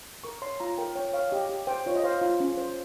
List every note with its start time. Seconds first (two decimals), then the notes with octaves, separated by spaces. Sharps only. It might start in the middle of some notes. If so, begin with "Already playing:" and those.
0.24 A#4 C#6
0.42 C#5 C6
0.60 F4 A#5
0.78 A#4 G5
0.95 C#5 G5
1.13 C#5 F5
1.31 G4 D#5
1.49 G4
1.67 C5 G5
1.86 F4 C#5
1.95 D#5
2.04 C5 F5
2.21 F4
2.40 C#4
2.58 C5